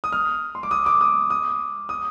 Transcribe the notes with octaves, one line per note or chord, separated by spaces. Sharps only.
D#6
F6
C6
D6
D#6
D6
D#6
D#6
D#6